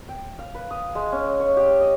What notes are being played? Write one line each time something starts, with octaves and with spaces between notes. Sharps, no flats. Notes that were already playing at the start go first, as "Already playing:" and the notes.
G5
F5
B4
D#6
G#3
C#4
C#5
G4
D#5